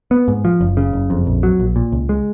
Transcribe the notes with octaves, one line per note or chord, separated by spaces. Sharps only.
B3
G#2
F3
F#1
C#3
F#1
F2
A#1
F#3
A#1
A#2
C#2
G#3